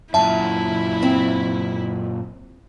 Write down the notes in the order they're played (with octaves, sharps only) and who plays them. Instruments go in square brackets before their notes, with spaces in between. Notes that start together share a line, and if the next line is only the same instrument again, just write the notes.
[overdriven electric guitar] F#2 A#2 [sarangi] E4 [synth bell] E5 A5
[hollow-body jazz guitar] C4